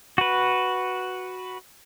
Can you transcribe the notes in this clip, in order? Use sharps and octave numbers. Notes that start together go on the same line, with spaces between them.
F#4 B4